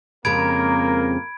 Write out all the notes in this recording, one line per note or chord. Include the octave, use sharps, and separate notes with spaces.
F2 C#3 G#3 A#3 A#4 B5 G#6 D7